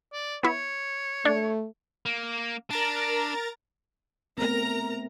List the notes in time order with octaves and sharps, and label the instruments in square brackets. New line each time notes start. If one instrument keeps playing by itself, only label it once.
[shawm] D5
[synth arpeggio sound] B3 E4 [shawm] C#5
[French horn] A3 [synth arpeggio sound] D4
[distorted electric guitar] A#3
[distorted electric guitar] D4 [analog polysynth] A#4 A#5 A6
[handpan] A3 B3 C4 [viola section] A#4 A#5